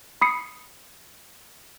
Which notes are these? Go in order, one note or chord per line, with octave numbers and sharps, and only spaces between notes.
B5 D#6 C7 C#7